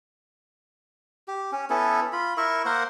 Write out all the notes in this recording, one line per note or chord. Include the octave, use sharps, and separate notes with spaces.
G4
C#4
B3 C#4 E4 A4
F4 B5
E4 A#4 E5 C#6
A#3 A#4 C5 F#5